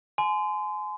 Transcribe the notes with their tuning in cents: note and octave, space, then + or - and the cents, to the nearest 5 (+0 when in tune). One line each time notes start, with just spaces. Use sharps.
G#5 +30 C6 -30